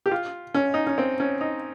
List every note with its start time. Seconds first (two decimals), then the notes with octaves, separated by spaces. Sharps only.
0.06 G4
0.11 F4
0.54 C#4
0.74 D#4
0.87 C#4
0.98 C4
1.20 C#4
1.41 D#4